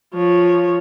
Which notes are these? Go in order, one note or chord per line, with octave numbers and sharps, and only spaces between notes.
F3 C#5